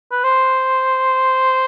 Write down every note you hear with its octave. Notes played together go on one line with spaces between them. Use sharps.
B4
C5